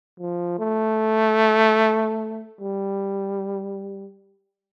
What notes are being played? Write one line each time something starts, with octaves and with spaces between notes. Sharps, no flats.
F3
A3
G3